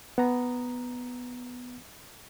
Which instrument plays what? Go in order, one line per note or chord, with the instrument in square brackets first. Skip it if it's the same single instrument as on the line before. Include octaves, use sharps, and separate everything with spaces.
[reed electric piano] B3 A#5